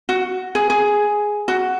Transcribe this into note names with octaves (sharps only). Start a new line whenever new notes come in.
F#4
G#4
G#4
F#4